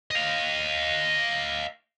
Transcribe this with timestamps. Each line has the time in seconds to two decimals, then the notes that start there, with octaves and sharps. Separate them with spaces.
0.11 D#5 F5